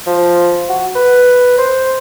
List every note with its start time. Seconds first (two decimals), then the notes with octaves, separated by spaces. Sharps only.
0.07 F3
0.69 F#4
0.96 B4
1.58 C5